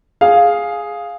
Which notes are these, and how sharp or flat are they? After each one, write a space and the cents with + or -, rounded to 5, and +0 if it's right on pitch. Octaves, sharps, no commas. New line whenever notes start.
G#4 +0 F5 +0